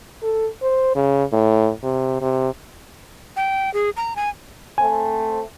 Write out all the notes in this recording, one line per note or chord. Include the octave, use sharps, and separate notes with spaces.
A4
C5
C#3
A2
C3
C3
G5
G#4
A#5
G#5
A3 C4 G#5